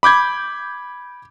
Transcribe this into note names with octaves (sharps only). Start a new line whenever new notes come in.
B5 D6 G6 G#6